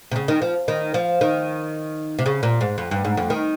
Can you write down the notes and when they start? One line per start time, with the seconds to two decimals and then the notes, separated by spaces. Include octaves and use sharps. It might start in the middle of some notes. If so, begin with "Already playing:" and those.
0.11 C3
0.16 C#3
0.28 D#3
0.42 F3
0.68 D#3
0.94 F3
1.21 D#3
2.19 C3
2.26 C#3
2.43 A#2
2.61 G#2
2.78 F2
2.91 G2
3.05 G#2
3.17 F2
3.30 D#3